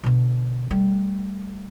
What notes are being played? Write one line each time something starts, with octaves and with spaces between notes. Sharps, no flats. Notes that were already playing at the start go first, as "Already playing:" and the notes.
B2 D3
G3 A3